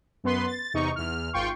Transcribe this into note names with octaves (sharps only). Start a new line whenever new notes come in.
F#2 B3 B4 C6
A6
E2 C3 D#4 C#6
E2 F6
G#1 F4 G5 C6 C#6